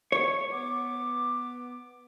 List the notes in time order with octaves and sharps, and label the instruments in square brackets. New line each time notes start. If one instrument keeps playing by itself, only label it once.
[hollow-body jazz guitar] C#5
[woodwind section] B3 D6